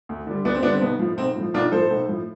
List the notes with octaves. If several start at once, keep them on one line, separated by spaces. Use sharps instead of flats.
D2
D3 G3
D2 B3 D4
C4
D3 G3 B3 D4
C4
B1 B3
A2 F3
B1 C4
A2
F3
B1 D4 F4
A2 F3 A4 C5
B1
A2 F3